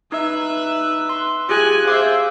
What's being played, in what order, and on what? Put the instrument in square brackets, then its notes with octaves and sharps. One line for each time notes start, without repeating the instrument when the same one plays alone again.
[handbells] D#4 [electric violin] B4 E5
[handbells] C6
[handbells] F4 G4 G#4 [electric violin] G#5 F#6
[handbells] G#4 F5 D6 [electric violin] C5 E5